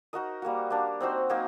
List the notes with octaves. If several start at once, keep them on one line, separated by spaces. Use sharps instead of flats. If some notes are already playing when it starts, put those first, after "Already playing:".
D#4 F#4 A#4 D#5
G3 A#3 F#4
A#3 D4 G4
C4 D#4 F#4 C5
F#3 A#3 D#4